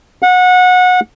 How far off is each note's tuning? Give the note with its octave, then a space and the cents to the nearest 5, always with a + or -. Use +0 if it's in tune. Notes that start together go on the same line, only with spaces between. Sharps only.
F#5 -25